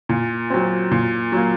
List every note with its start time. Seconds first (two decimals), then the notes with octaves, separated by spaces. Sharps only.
0.09 A#2
0.50 F#3 C4
0.91 A#2
1.32 F#3 A#3